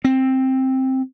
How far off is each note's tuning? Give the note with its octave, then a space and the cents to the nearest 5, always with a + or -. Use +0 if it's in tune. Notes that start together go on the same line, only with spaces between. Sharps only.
C4 +5